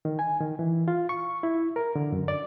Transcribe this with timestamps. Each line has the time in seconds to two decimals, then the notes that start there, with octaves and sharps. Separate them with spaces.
0.05 D#3
0.19 G#5
0.40 D#3
0.59 E3
0.88 F4
1.09 C#6
1.43 E4
1.76 A#4
1.96 D3
2.12 F#2
2.28 D5